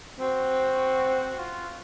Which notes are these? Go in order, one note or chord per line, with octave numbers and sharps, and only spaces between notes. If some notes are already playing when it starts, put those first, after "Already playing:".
C4 F#4
F#4
F4